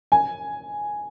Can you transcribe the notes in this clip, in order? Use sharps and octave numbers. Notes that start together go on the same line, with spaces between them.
G#5